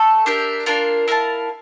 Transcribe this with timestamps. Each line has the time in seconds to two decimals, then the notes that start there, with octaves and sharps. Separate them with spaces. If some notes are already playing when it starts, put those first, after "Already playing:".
Already playing: A3 A4
0.26 D4 G4 A#4 E5
0.66 A#3 D4 F4 A#4
1.08 E4 A#4 F5 A5